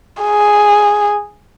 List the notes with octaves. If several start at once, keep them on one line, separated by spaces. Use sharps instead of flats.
G#4